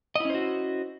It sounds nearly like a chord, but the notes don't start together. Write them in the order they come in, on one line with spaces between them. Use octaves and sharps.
D#5 E4 C#4 C5 F#4